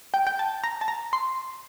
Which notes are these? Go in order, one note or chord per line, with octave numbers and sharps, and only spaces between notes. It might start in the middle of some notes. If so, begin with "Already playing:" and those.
G5
G5
A5
A#5
A5
A#5
C6